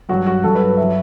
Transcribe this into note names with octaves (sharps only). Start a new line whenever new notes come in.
G2 F#3 F#4
F#4
G2 F#3 A4
B4
F#3 E5